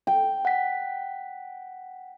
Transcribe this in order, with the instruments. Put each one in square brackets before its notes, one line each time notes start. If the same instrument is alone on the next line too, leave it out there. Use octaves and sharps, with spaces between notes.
[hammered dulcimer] G5
[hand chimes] F#5 B6